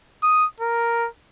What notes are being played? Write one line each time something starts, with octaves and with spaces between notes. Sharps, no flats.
D#6
A#4